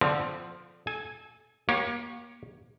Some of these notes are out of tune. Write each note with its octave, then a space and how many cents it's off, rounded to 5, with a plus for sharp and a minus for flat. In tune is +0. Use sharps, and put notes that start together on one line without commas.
D3 +0 F3 +0 C4 -25
A4 -30 G#5 +0
A#3 +35 G4 +0 C#5 +0